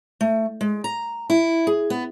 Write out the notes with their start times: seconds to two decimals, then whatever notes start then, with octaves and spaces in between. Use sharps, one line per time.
0.21 A3
0.61 G#3
0.84 A#5
1.30 E4
1.67 G#4
1.90 B3